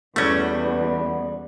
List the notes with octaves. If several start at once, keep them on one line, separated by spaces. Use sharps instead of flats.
E2 G3 A3 B3 C#4 F#4